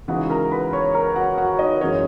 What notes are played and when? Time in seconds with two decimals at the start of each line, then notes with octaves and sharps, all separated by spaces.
0.08 C#3 E3 G#3 D#4 F#4 F#5
0.30 A#4 A#5
0.51 B4 B5
0.73 C#5 C#6
0.94 A#4 A#5
1.16 F#4 F#5
1.38 F#4 F#5
1.59 D#4 D#5
1.81 F#2 E3 G#3 C#4 C#5